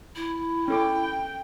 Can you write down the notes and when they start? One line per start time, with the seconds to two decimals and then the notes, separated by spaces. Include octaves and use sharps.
0.16 E4
0.68 C#4 A4 G5 D6